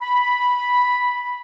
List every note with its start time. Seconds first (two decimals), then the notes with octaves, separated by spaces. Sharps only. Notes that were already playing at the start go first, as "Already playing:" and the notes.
0.02 B5